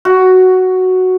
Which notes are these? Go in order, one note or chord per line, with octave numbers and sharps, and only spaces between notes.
F#4